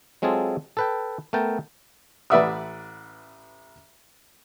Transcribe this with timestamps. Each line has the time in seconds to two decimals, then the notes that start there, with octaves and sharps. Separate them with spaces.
0.22 F#3 G#3 C4 F4 G#4 A4
0.77 A4 B4 G5
1.33 A3 B3 A#4 G5 A5
2.30 A1 B4 D5 E5 F#5 D#6